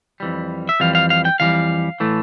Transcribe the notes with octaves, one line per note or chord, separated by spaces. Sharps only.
F2 E3 G3
E5
F2 E3 G3 F5
F5
F5
G5
F2 E3 G3 F5
A2 E3 A3